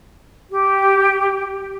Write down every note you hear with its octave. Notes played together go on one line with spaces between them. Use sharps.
G4